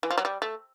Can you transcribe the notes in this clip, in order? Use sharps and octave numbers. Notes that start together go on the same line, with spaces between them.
E3
F3
F#3
G3
A3